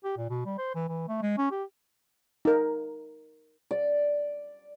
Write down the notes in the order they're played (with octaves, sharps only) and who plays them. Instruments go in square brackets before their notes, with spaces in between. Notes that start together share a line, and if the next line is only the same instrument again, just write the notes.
[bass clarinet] G4
A#2
B2
G3
C5
E3
E3
A3
G#3
C#4
G4
[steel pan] D#4 A#4
[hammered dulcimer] D5